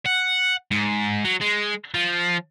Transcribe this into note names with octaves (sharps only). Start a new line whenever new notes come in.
F#5
G#2
F#3
G#3
F3